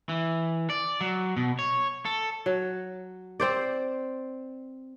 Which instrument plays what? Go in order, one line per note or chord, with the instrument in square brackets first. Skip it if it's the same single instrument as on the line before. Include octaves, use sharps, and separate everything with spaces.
[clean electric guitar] E3
D5
F#3
B2
C#5
A4
[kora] F#3
C4 C5 D5